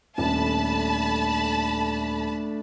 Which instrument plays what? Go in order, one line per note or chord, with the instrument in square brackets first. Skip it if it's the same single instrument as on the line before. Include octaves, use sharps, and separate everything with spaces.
[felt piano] D#1 [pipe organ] A3 D4 [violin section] A5 B5